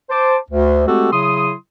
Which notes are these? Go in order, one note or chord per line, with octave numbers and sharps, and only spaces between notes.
C5 A5 D6
D2
G#3 A3 C4 F#4 G4 A4
C#3 F#3 E4 C6 D#6